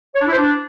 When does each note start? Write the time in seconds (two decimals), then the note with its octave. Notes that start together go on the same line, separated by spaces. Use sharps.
0.15 C#5
0.21 D4
0.26 E4
0.32 C5
0.38 D4